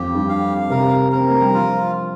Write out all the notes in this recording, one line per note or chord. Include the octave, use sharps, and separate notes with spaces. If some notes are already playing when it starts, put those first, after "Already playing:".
Already playing: F2 G4
G2
F5
C3 A#4
C4 A#4
A#3
G3
F3 F4